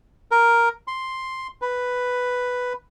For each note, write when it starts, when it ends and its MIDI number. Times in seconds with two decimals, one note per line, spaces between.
0.31 0.69 70
0.87 1.47 84
1.62 2.73 71